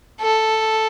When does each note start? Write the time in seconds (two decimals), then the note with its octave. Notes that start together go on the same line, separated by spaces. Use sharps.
0.21 A4